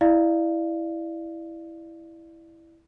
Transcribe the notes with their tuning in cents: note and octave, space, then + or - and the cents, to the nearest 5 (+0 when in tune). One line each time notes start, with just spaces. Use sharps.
E4 +0 D5 +25 F5 -20